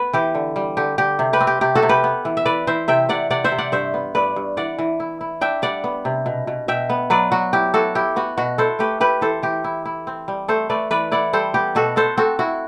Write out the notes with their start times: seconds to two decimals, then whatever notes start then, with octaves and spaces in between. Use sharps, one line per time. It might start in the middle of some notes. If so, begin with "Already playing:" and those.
Already playing: B3 B4
0.13 E3 G4
0.35 D3
0.56 G3
0.77 D3 G4
0.98 D3 G4
1.19 C3
1.33 G4 B4
1.40 C4
1.47 G4
1.61 C3 G4
1.75 F#4 A4
1.83 C3
1.89 G4 B4
2.04 B3
2.25 E3
2.37 E5
2.46 E3 B4 D5
2.67 E3 C5 E5
2.88 C3 E5 G5
3.09 C3 D5 F#5
3.30 C3 D5 F#5
3.44 C5 E5
3.52 C3
3.58 D5 F#5
3.72 G2 C5 E5
3.94 B3
4.15 G2 B4 D5
4.36 G2
4.57 E3 D5 F#5
4.78 E3
5.00 E4
5.21 E4
5.41 D4 E5 G5
5.62 G3 D5 F#5
5.84 B3
6.05 C3
6.26 B2
6.47 B2
6.68 B2 E5 G5
6.89 B3
7.10 F#3 B4 D5
7.32 F#3 F#4
7.53 E4 G4
7.74 E4 F#4 A4
7.95 E4 G4
8.16 B3 F#4
8.38 B2 F#4
8.58 E4 A4 C5
8.79 A3 G4 B4
9.00 E4 G4 B4
9.21 E3 A4 C5
9.42 E3 G4
9.64 E4
9.85 E4
10.07 C4
10.28 G3
10.48 A3 A4 C5
10.70 A3 B4 D5
10.91 E3 B4 D5
11.12 E4 D5 F#5
11.33 G3 A4 C5
11.54 B3 G4
11.75 B2 F#4 A4
11.96 B3 A4 C5
12.17 C4 F#4 A4
12.39 E4 F#4